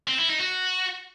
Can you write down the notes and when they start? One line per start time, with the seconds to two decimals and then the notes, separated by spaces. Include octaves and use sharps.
0.08 C4
0.18 E4
0.29 D#4
0.40 F#4